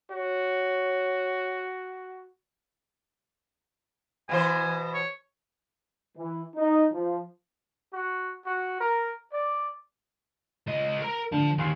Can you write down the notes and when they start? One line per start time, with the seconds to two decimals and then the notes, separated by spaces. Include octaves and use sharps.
0.11 F#4 C#5
4.29 B2 E3 C5 G#5
4.94 C#5
6.16 E3
6.56 D#4
6.91 F3
7.93 F#4
8.45 F#4
8.79 A#4
9.31 D5
10.67 C#2 D#5
11.01 A#4 A#5
11.32 D3 F3 A5
11.58 D#2 G#5 C6 C7